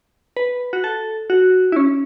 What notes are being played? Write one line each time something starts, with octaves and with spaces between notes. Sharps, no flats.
B4
F#4
A4
F#4
E4
C#4